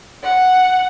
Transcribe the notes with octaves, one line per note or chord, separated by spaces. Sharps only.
F#5